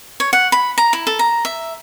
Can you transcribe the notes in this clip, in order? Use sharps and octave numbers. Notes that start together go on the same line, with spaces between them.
C#5
F#5
B5
A#5
E4
A4
A#5
E5